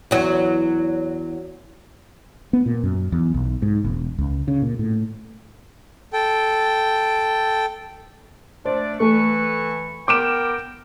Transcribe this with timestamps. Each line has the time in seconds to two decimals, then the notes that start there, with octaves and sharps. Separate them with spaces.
0.11 E2 F#3
2.53 B3
2.66 A#2
2.83 F#2
3.12 E2
3.34 B1
3.62 G#2
3.85 E1
4.18 C#2
4.48 C#3
4.62 A#2
4.79 A2
6.13 A4 G5
8.65 A3 D4 C5 D5
9.00 E3 A3 B4 C#6
10.08 B3 A#4 G5 D6 D7 E7